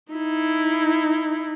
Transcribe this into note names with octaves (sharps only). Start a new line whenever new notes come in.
D#4 E4